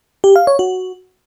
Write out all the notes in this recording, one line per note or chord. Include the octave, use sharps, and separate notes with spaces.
G4
F5
C#5
F#4